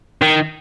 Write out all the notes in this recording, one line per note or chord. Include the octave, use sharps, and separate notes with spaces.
D#3